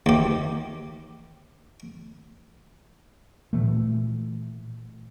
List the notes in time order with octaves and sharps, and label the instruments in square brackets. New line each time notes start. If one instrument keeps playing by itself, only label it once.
[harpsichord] D#2 G4
[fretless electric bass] A#2 E3 A3